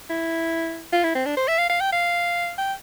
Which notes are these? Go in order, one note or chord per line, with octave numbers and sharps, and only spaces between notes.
E4
F4
E4
C4
D4
C5
E5
F5
F5
G5
F5
G5